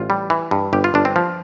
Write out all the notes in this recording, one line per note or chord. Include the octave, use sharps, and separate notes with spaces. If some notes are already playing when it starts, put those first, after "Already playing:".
Already playing: A1 F4
G3
E3
G2
G1 G4
F4
G1 D4
C4
F3